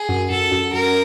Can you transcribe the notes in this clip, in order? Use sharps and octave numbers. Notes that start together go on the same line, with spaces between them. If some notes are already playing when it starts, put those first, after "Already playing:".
Already playing: G#4
F#2
F#2 A4
F#2
F#2 A#4